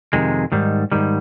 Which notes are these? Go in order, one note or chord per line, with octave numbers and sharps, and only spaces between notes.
F2 C3 D#3 G#3
G#2 D#3 G3
G#2 D#3 G3